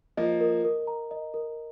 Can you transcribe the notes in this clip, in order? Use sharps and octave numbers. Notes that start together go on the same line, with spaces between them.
F3 A#3 D#5
A#4
A#4
A#5
D#5
A#4